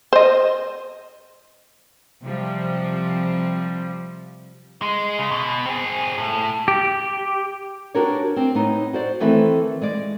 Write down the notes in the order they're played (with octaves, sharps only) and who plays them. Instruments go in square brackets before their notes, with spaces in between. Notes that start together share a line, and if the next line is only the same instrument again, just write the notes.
[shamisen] C5 D#5
[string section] C3 F3 G3
[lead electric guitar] G#3
C#3
B2
C4 G#4
A2
[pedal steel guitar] G4
[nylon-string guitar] D4 F#4 G4 A#4 B4 C#5
C4
A2 B3 D#4
F#4 C5 D5
D#3 E3 A3 C4 B4 E5
G#3 D5